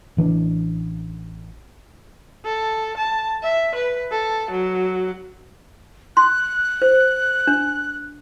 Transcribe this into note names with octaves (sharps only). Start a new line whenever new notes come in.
A1 E3 G3 D4
A4
A5
E5
B4
A4
F#3
C6 F#6
C5
D4